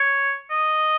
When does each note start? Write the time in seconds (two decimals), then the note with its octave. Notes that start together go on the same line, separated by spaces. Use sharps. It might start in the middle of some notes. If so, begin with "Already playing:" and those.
Already playing: C#5
0.50 D#5